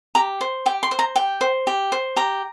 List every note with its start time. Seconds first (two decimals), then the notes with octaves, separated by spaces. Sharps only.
0.15 G4 A#5
0.41 C5
0.66 G4 G5
0.83 C6
0.91 C5
0.99 A#5
1.16 G4 G5
1.41 C5
1.67 G4
1.92 C5
2.16 G4 A#5